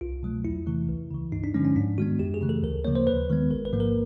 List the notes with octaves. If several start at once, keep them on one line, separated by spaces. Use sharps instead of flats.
C2 F4
B2 F#3 A3
E2 E4
C3 E3 A3
C#2
C#3 E3
G2 D#4
D4
D3 F3 G#3 C#4
C#4
G#2 D4
D#3 G#3 B3 F#4
F#2 G4
G#4
C#3 E3 A3
A4
D2 A#4
C#3 F3 A#3 C#5
C5
D#2 B4
D#3 G#3 B3
A1 A#4
B4
G#2 F3 A#3
A#4